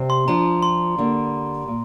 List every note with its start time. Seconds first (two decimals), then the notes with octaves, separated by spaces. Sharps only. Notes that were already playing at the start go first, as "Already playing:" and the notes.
Already playing: C3 G3 C4 G4
0.10 C6
0.28 F3 D4 F4 A#5
0.62 C6
0.98 D3 G3 A#3
1.68 A#2